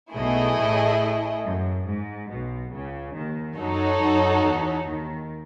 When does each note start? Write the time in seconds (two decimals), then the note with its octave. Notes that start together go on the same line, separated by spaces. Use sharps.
0.13 B1 B2 A3 E4 G#4 D#5
0.56 A1 A2
1.42 F#2
1.85 G#2
2.28 B1 B2
2.71 C#2 C#3
3.14 D#2 D#3
3.57 F#2 F#3 D#4 F#4 A4 C#5
4.00 F#2 F#3
4.43 E2 E3
4.86 D#2 D#3